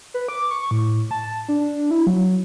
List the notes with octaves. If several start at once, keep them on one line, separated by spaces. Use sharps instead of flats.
B4
D6
C#6
A2
A5
D4
E4
F#3